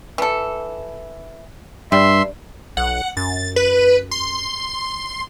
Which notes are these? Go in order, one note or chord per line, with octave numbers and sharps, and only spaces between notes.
E3 A4
G2 G3 E5 C6
B1 F#5
F#2 A6
B4
C6